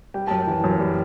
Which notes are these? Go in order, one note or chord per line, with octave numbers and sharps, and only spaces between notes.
G3 G5
F#2 A5
G5
E3
F#2
G3